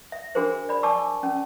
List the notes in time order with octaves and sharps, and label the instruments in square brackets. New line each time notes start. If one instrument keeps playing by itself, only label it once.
[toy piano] E5
D4 F#4 G#4 A#4 C5
D5 B5
D5 G#5 A5 C#6 D6 E6
C#4